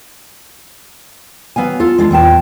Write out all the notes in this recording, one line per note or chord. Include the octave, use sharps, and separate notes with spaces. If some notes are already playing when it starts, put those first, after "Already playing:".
F#3 B3 F5 G#5
F4 A4
G#3 D4 F4
E2 A#2 G5 A5